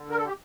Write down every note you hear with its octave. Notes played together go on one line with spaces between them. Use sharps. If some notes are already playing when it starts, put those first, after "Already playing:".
Already playing: D3
A#4
A4
G4